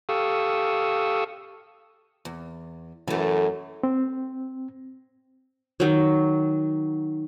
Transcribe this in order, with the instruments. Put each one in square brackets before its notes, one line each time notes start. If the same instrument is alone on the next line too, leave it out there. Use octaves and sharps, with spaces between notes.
[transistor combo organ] G4 A4 F5 C#6 D#6 E6
[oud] E2
[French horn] F#2 [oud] E3 A3
[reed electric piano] C4
[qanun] D#3 F#3